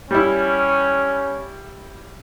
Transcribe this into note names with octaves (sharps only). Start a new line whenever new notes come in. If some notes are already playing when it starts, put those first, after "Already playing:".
G3 C#4 E4